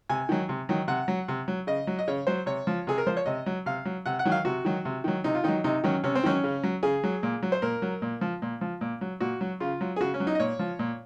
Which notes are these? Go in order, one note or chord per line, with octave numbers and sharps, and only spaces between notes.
C3 G#5
D#3 F#3
C3
D#3 F#3
C3 F#5
F#3
C3
F#3
C#3 D#5
F#3
D#5
C#3 C#5
F#3 C5
C3 C#5
F3
C3 G#4
A#4
F3 C5
C#5
C3 D#5
F#3
C3 F5
F#3
C3 F#5
F#5
D#3 F#3
F5
C3 F#4
D#3 F#3
C3
D#3 F#3
C3 D#4
F4
D#3 F#3 D#4
C3 D#4
D#3 F#3 C#4
C3 C#4
C4
D#3 F#3 C#4
C#3
F#3
C#3 G#4
F#3
A#2
F#3
C5
A#2 A#4
F#3
A#2
F3
A#2
F3
A#2
F#3
A#2 F#4
F#3
C#3 F4
F#3
G#4
C#3 F#4
C#4
F#3
D#4
D#5
A#2 C#5
F3
A#2